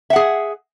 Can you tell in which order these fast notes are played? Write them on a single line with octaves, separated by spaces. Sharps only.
E5 F#5 G#4